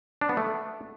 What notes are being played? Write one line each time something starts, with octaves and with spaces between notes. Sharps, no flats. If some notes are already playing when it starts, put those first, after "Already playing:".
D4
B3
A3